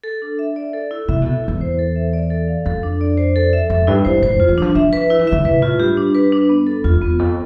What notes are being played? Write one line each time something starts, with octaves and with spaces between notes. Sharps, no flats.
A4
D4
E5
D5
A4
E4
C3 E5
B2 A4
E2 E4
C5
A4
E5
D5
A4
F5
F2 A4
D4
D5
C5
A4
E5
F2 A4
G2 E4
G2 C5
A2 C5
F2 F4
E3
F3 D4
F3 E5
B4
E4
E3
D3 E5
C3 B4
A2 F4
G2 G4
D4
B4
D4
B3
A4
E2 F4
E2 B3
F2 A4